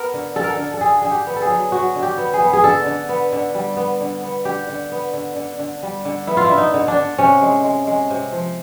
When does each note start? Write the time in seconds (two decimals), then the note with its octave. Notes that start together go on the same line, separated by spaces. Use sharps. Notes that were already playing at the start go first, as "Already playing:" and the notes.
Already playing: B3 A#4
0.14 D3
0.36 D3 A4
0.44 A#4
0.51 A4
0.58 D3
0.74 A4
0.81 D3 G#4
1.02 D3 G#4
1.11 G4
1.27 B3
1.36 A4
1.42 G#4
1.49 F#3
1.72 F#3 F#4
1.95 D3
2.03 G4
2.18 B3
2.34 G#4
2.41 B3
2.53 G#4
2.64 D3 A4
2.86 D3
3.09 B3
3.33 D3
3.55 G3
3.77 B3
4.01 D3
4.23 B3
4.45 D3 G4
4.69 D3
4.92 B3
5.13 D3
5.36 D3
5.59 D3
5.83 G3
6.05 D3
6.27 B3 E4
6.37 F4
6.44 E4
6.51 D3
6.58 D#4
6.74 D3
6.88 D4
6.97 D3
7.18 C3 C#4
7.42 G#3
7.64 G#3
7.87 G#3
8.10 C3
8.33 F3